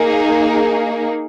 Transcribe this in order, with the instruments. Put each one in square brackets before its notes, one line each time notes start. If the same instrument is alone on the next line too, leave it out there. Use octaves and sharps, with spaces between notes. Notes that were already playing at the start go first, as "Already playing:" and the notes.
Already playing: [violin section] A#3 D#4 G#4